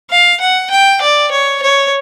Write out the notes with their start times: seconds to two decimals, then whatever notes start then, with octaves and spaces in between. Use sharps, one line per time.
0.11 F5
0.40 F#5
0.71 G5
1.02 D5
1.31 C#5
1.62 C#5